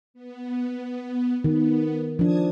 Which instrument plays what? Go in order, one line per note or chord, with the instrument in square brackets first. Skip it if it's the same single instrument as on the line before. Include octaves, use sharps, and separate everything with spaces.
[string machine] B3
[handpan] D#3 [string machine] B3
[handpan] F3 D4 [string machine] A5 D#6 G#6